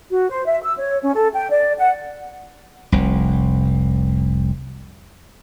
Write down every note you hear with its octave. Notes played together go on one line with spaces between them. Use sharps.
F#4
C5
E5
E6
C#5
C#4
A4
G5
D5
F#5
F1 C2